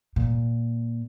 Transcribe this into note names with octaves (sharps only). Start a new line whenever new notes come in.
A#2